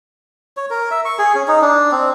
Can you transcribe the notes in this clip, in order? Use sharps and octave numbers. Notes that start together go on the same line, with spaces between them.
C#5
A#4
E5
C#6
G#4
C#4
D#4
D4
C4